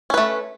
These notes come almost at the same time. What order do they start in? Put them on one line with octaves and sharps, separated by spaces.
C#4 B4 A3